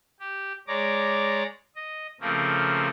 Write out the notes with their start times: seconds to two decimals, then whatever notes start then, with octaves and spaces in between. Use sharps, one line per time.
0.20 G4
0.68 G#3 C#5 D5 A#5 D6
1.76 D#5
2.21 C#3 F3 A3 A#3 C4